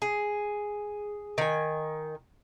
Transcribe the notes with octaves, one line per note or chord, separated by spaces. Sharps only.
G#4
D#3 G#5